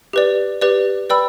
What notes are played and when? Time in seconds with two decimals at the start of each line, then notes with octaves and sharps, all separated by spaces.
0.13 G4 B4 D5
0.61 G4 B4 D5
1.10 B4 D5 G5 B5 E6